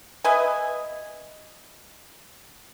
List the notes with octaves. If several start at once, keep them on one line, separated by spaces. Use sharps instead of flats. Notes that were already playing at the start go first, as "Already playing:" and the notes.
B4 D#5 E5 G#5